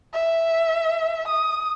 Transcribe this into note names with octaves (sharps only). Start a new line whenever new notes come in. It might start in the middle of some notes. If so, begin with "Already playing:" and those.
E5
D#6